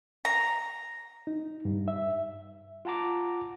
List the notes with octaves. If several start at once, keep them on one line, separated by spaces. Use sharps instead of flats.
A#5
D#4
G2
E5
F4 F#5 A5 A#5 D6